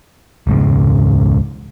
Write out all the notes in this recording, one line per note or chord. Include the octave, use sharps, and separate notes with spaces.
E1 C#2 G#2 C#3